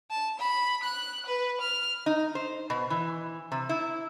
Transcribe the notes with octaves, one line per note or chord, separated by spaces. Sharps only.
A5
B5
F#6
B4
F6
D#4
C5
B2
E3
C3
E4